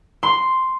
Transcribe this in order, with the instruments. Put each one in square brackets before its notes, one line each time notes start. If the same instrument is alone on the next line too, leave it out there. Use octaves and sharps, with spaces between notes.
[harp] C6